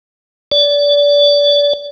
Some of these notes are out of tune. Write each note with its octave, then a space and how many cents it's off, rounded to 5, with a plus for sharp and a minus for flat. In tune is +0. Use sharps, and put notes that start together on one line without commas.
D5 -30